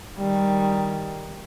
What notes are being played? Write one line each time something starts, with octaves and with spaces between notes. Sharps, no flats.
D#3 G3